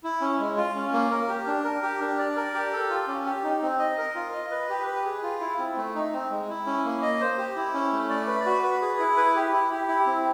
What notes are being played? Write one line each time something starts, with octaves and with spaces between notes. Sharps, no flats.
E4
C#4
G#3
F4
C#4
A#3
A#4
G4
D4
A#4
G4
D4
D5
A#4
G4
A4
F4
C#4
G4
D#4
C4
D#5
A#4
F4
D#5
B4
G4
B4
G#4
F4
E4
C4
A3
D#4
C4
G#3
E4
C#4
A#3
D#5
C5
G4
E4
C#4
A3
D5
B4
F#4
B4
G#4
E4
B4
G4
E4
G4
E4
C4